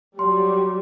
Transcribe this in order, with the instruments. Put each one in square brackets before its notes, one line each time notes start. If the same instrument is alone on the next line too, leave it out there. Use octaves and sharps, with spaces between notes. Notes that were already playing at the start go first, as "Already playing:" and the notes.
[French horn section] F#3 [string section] G3 [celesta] C6